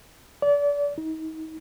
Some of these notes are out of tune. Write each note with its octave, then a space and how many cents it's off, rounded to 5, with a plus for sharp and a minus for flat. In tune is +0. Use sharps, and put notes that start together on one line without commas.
D5 -30
D#4 +35